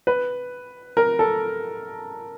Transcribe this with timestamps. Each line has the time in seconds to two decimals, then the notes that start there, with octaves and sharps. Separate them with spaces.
0.07 B4
0.97 A#4
1.19 A4